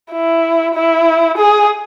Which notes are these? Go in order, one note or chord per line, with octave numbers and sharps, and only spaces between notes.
E4
E4
G#4